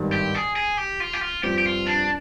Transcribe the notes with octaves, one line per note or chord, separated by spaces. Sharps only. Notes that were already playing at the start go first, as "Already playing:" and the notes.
Already playing: G#1 G2 D#3
G4
G#4
G#4
G4
F4
G4
F4
G2 F3 C4 G4
G4
F4
D4